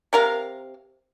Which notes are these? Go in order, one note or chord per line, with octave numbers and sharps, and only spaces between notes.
C3 A#4 F5